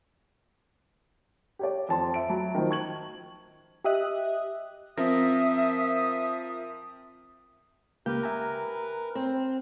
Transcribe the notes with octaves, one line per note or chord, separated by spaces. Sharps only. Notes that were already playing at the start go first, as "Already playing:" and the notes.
G4 C#5 D5
F2 A5 C6
E5 D7
F#3 A5 B5
D#3 F3
A5 C#6 G#6 F#7
G4 D#5 E5 D#6 F#6
F3 C4 A#4 E5 D#6 A#6
C#2 A#3 G4 A#4 B4 G6
E5 G#5 A#5
C4